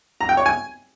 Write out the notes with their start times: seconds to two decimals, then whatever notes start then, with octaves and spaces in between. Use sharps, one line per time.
0.21 A#5
0.29 G5
0.37 C#5
0.46 G#5